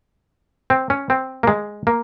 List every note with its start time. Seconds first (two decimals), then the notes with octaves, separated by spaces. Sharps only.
0.70 C4
0.90 C#4
1.10 C4
1.43 A#3
1.47 G#3
1.87 A#3